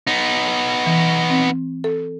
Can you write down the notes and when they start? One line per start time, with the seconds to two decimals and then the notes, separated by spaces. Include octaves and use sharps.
0.07 B3 D#4
0.86 E3
1.30 C4
1.84 A4